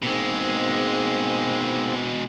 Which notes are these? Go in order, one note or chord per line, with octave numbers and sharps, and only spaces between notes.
G#2 B2 G#3 A#3 C4